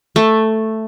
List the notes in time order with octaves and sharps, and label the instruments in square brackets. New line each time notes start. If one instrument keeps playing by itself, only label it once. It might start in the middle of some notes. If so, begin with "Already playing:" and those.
[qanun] A3